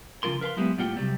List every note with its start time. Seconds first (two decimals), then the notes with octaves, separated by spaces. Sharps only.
0.23 C#3 F3 F4 A#4 C6
0.41 A#4 B4 F5 G#5 C6
0.57 F#3 G#3 B3 E4 G4 G#4
0.78 A2 G3 A#3 F4 F#5 G5
0.96 C3 F#3 G3 C4